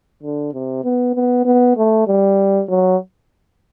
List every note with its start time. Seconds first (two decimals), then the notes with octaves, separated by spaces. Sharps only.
0.23 D3
0.53 C3
0.84 B3
1.15 B3
1.45 B3
1.76 A3
2.07 G3
2.69 F#3